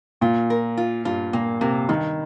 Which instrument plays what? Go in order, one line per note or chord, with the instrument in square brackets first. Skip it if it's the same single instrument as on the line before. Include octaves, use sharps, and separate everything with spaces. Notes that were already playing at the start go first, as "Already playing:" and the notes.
[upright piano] A#2 [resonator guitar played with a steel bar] F4
[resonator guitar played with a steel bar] A#4
F4
[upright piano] G2 [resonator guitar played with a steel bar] F4
[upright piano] A#2 [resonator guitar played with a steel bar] A#3
[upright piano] C3 [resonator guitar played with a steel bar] A#3
[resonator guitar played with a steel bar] G2 [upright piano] D#3